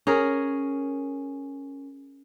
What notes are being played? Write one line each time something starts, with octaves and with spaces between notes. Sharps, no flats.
C#4 G#4 A#4